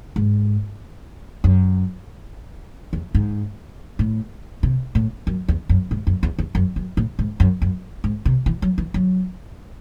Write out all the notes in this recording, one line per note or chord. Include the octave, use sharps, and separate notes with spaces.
G#2
F#2
E2
G#2
A2
C3
A2
F#2
E2
F#2
G#2
F#2
E2
E2
F#2
F#2
A2
G#2
F#2
F#2
G#2
C3
E3
F#3
E3
F#3